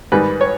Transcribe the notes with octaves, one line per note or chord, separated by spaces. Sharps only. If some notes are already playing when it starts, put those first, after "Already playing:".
G#2 D#3 G3 B4
C#5